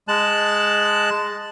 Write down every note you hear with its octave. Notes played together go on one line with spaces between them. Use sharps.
G#3 A5 F#6